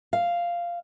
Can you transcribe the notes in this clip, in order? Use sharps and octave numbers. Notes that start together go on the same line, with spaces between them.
F5